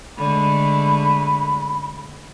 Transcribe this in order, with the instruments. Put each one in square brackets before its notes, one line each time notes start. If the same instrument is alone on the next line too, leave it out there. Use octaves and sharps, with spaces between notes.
[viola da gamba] D3 G#3 A3 [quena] B5